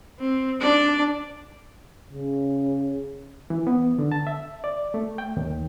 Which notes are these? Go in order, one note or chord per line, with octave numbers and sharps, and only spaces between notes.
C4
D4 D5
C#3
E3
B3
D3
A5
E5
D5
A3
G5
D#2